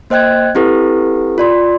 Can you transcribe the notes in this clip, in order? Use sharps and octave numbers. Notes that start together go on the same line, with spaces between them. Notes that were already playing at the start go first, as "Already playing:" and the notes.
A#3 C5 D#5 G5 F#6 G#6
C4 E4 G4 A4 B4
F4 D5 C6